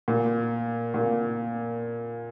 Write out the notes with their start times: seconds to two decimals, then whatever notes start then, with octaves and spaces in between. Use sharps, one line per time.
0.08 A#2
0.94 A#2